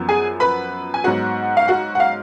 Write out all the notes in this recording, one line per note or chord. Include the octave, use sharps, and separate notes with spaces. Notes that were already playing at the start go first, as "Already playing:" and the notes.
Already playing: F#2 F3 B3
G#4 G#5
B4 B5
G#5
G#2 F#3 B3 F#4 F#5
F5
F#4 F#5
F#5
F5